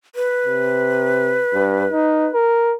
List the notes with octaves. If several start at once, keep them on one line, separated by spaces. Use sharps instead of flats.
B4
C3
G2
D#4
A#4